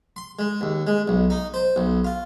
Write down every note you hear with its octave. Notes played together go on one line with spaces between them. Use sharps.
C6
G#3
D#2
G#3
B1
D#4
C5
B1
F4